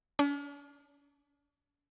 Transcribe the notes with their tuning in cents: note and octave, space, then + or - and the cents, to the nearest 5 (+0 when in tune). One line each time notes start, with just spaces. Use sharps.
C#4 +45